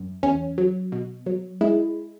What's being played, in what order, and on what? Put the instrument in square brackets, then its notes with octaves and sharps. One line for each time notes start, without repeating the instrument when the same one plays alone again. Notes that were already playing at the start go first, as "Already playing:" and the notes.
Already playing: [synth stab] F#2
E2 C#4
F#3
B2
F#3
G#3 E4